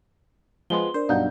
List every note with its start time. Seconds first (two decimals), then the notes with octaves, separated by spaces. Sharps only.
0.70 F3 G#3 B3 C6 G7
0.94 D4 A#4 C5 D5
1.09 B1 G2 D#4 D5 F5 F#5 G6